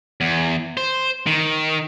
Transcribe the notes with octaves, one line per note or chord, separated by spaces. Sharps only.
E2
C5
D#3